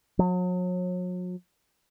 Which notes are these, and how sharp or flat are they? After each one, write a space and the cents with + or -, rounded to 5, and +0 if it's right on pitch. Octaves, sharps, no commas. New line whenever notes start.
F#3 -40